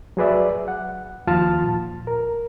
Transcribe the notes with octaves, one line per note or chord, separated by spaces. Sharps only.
F#3 F#4 G#4 B4 D5 E5
F#5
D#2 F3 F4 A5 F6
A#2
A#4